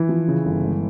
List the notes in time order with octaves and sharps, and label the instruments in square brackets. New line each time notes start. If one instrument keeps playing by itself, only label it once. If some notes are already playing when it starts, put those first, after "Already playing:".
Already playing: [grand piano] E3
[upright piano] F3
C#3
G1
G#3